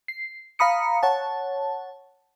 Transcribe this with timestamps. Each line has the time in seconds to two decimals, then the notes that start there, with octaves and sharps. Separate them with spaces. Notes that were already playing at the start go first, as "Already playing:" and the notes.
0.08 C7
0.59 F5 A#5 B5 D#6 C#7
1.03 C#5 F#5 A5